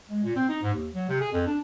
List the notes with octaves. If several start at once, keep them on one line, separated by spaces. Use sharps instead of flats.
G#3
A#2
C4
D#4
G#2
D#2
F#3
C3
G#4
F2
D4